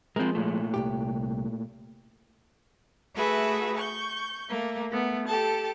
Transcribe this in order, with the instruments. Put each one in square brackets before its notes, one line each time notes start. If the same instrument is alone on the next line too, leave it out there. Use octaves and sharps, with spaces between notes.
[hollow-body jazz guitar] F3 G#3 [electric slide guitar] C4 A#4
[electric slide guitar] A#2 A3
[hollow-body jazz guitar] C2 F#2 G4
[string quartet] A3 F#4 G#4 B4 E5
C#6 G6
A3 A#3
A3 B3
G4 A4 A5